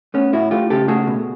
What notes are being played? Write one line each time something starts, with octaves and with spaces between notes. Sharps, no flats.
A3 B3 C#4
A2 E4 F#4
A3 F4 G4
C#3 G4 A4
A3 F#4 G#4
B2